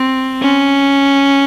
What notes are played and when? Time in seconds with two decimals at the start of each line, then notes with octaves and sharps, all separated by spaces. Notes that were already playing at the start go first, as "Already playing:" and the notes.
Already playing: C4
0.41 C#4